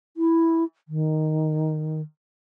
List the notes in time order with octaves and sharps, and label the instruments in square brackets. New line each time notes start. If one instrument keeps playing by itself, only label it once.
[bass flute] E4
D#3